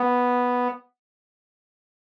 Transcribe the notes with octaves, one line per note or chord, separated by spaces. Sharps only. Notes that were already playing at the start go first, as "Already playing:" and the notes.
Already playing: B3